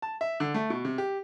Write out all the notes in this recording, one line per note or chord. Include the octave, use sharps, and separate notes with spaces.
A5
E5
D3
A3
B2
C3
G4